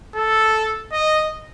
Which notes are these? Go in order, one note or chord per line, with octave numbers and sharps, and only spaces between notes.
A4
D#5